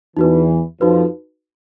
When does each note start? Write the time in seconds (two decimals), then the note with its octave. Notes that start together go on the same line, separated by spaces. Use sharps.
0.17 E2 E3 D#4 F#4 B4
0.80 F2 F3 D#4 F#4 B4